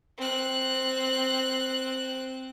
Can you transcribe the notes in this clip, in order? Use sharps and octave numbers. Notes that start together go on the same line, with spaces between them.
C4 F#6